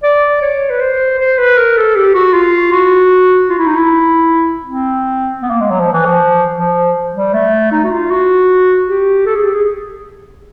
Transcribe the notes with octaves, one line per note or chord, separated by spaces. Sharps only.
D5
C#5
B4
C5
C5
B4
A#4
A4
G4
F#4
F4
F#4
F4
E4
D#4
E4
C4
B3
A#3
G#3
F#3
F3
E3
F3
F3
G3
A3
D#4
F#4
F4
F#4
G4
A4
G#4
G4
G#4